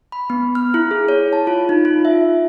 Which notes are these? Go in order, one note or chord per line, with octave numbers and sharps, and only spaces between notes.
B5
B3
F6
E4
G#4
C#5
A5
F4
D#4
F4
E5